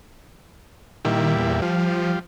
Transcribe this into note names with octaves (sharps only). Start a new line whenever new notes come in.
A#2 D#3 G3 E4
E2
F3 G3 F4